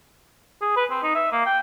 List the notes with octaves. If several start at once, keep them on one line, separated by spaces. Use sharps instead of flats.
G#4
B4
C4
D#4
E5
A#3
G5